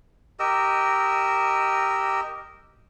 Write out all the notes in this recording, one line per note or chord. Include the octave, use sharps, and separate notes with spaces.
G4 A#4 D#5 E6